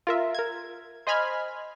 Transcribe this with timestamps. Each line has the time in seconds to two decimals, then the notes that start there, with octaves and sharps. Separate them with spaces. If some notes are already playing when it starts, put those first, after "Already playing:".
0.07 F4 A#4 E5
0.35 A#4 G#6
1.07 C5 D#5 G#5 B5 F6 G#6